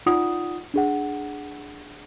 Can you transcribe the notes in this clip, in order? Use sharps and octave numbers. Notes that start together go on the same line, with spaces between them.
D#4 F4 D5 F#5 D#6
D4 G#4 F#5